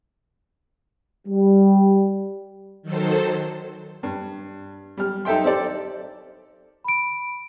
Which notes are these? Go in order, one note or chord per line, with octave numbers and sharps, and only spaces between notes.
G3
D#3 F#3 A4 C5
G2
G3 F6
D#4 A4 E5 G5 C6
C4 G4 A4 D5
B5 D7